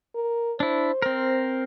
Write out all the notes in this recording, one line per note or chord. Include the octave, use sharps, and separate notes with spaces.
A#4
D4 E4 C5
C4 A#4